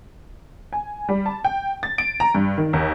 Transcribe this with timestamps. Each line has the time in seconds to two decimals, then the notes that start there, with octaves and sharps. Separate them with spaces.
0.73 G#5
1.09 G3
1.26 A5
1.44 G5
1.83 A6
1.98 D7
2.20 A#5
2.35 G2
2.58 D#3
2.73 D#2